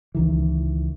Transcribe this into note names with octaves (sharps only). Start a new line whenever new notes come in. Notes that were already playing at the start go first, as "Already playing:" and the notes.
C#2 D#3 E3